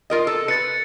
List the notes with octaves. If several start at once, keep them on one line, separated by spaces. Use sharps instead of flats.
F4 A#4 D#5
A4
B4 A6 C#7